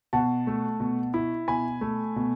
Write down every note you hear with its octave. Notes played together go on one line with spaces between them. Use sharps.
B2 F#5 A5
A3
B2
E4
B2 G#5 B5
A3
B2